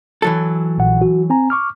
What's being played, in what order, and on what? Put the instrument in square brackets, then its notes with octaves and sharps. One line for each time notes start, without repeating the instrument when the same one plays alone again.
[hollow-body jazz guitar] E3 F#3 A4
[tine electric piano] A#1 A#2 F#5
F#4
C4 G#5 A#5
C#6 D6 F6